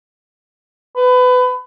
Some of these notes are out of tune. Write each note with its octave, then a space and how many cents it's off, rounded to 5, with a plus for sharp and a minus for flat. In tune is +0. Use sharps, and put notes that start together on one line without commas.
B4 +25